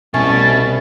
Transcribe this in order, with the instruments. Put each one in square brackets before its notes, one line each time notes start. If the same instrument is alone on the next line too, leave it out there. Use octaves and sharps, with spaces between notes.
[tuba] C2 [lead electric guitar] B2 [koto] A3 C#4 [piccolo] A6